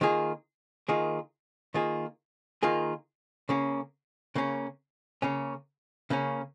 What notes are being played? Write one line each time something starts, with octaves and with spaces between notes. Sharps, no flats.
D#3 A#3 F4 G#4
D#3 A#3 F4 G#4
D#3 A#3 F4 G#4
D#3 A#3 F4 G#4
C#3 A#3 C#4
C#3 A#3 C#4
C#3 A#3 C#4
C#3 A#3 C#4